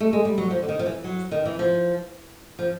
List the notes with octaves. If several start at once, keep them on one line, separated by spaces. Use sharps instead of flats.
A3
G#3
G3
F#3
F3
D3
D#3
F3
E3
F#3
D#3
E3
F3
F3